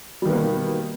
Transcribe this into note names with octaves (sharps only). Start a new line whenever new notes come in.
B2 D#3 G3 A#3 B3